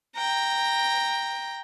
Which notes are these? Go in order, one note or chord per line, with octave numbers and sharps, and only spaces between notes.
G5 A#5